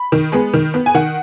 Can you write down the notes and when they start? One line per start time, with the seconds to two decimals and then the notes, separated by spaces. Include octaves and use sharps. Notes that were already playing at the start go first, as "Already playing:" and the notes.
Already playing: B5
0.12 D#3
0.32 G#3 B3
0.54 D#3
0.74 B3
0.86 G#5
0.94 D#3 F#5